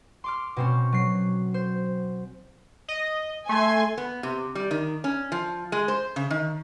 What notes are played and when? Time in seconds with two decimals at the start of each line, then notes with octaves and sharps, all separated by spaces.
0.24 C6 D6 F6
0.57 B2 C4 C#4
0.92 F#3 C7
1.54 C5
2.88 D#5
3.49 A3 G#5 C6
3.98 B3
4.23 C3
4.55 G3
4.71 D#3
5.04 C#4
5.32 F3
5.72 G#3
5.88 C5
6.16 C#3
6.30 D#3